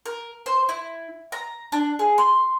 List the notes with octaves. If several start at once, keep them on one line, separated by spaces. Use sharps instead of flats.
A#4
C5
E4
A#5
D4
G#4
C6